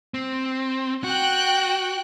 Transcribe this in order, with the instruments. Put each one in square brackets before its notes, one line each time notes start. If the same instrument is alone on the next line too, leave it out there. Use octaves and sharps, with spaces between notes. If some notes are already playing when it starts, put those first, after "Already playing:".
[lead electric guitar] C4
[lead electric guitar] F#4 [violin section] G5 F#6